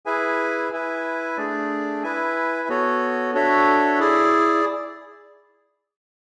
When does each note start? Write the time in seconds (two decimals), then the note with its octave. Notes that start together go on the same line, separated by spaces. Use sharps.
0.06 E4 G#4 B4 E5 G#5
0.72 E4 B4 E5 G#5
1.37 A3 D4 G#4 D5
2.03 E4 B4 E5 G#5
2.69 B3 F#4 A4 C#5
3.34 D4 F#4 A4 C#5 E5
3.99 E4 G#4 D5